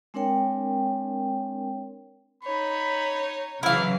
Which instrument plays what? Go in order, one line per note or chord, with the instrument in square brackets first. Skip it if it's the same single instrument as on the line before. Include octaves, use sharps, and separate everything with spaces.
[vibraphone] G#3 C4 D4 A#4 C#5 G5
[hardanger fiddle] D#4 C#5 [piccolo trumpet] B5
[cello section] C#3 E3 F#3 [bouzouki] E4 F5 [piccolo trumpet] F6